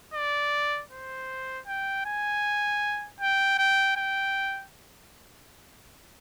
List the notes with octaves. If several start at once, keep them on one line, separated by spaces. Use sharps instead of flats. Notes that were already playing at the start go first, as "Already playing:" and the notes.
D5
C5
G5
G#5
G5
G5
G5